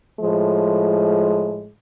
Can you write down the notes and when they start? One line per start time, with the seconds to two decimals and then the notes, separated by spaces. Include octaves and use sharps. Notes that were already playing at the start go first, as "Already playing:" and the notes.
0.19 A2 F3 G#3